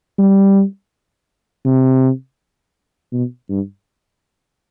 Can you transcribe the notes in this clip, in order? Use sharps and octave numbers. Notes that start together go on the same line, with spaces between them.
G3
C3
B2
G2